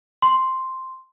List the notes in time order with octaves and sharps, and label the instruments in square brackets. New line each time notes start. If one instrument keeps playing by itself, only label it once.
[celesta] C6